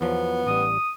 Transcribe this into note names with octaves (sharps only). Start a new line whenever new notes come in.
E2 F3 F#3 B3
A1 G3 D#6